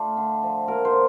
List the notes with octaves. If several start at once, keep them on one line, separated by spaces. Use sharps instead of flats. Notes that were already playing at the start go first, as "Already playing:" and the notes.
Already playing: A3 D4 F4
D3
F3
A#3 A#4
C5
D3